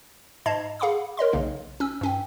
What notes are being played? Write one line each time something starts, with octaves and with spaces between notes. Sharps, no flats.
G#2 D#5 A5 A#5 G#6 C7
G#4 F5 F#5 B5 D6 D#6
A#4 C#5 D#5 C6
B1 C#3 A#3 D#4
C#4 E6
G2 C#4 G5